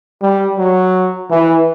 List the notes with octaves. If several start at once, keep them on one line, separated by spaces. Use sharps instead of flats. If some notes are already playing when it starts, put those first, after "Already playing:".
G3
F#3
E3